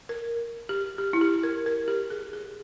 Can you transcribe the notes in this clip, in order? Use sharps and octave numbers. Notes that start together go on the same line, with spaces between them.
A#4
G4
G4
E4
G4
A#4
A#4
G4
G#4
G#4